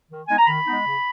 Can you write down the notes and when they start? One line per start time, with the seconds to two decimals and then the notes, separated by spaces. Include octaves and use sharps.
0.09 D#3
0.28 G#3 B3 D#4 G#5
0.37 A#5
0.47 D#3 B5
0.66 G#3 B3 D#4
0.84 C#3